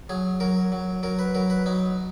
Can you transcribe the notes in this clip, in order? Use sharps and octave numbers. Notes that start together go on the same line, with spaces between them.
F#3 G#4
F#3 A#4
F#3
F#3 A#4
B4
F#3 A#4
B4
F#3 D#4